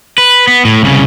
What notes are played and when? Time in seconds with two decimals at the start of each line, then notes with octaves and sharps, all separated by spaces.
0.18 B4
0.47 B3
0.65 A2
0.83 C2 C#3